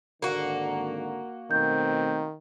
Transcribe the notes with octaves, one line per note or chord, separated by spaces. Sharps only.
G#1 D3 A#3 F#4
B2 D#3 A3 C4 G6